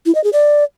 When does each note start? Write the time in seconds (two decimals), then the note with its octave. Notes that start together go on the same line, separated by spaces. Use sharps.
0.06 E4
0.15 D#5
0.24 G#4
0.33 D5